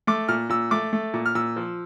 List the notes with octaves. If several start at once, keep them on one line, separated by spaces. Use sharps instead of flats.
A3 D6
A#2 F6
A#2 E6
A3 D6
A3
A#2
F6
A#2 E6
F3